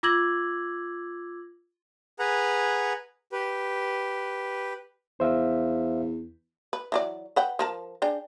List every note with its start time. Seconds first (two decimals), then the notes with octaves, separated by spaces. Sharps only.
0.03 F4 D6 E6 G#6 A#6 F#7
2.19 G#4 B4 F#5 A#5
3.32 G4 B4
5.20 E2 C5 E5 F5
6.73 B4
6.92 E3 F#3 D5
7.36 B4 F#5 G5
7.59 F3 A#4 A5
8.02 D4 G#4 G5